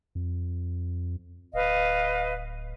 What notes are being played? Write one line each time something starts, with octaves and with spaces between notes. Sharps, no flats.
F2
D1 B4 D#5 F5